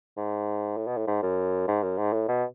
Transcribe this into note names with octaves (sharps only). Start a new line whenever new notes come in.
G#2
A2
B2
A2
G#2
F#2
G#2
F#2
G#2
A2
B2